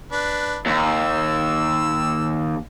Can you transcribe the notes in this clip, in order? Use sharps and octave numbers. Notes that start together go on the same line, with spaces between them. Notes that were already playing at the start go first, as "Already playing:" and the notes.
D4 B4
D#2 E6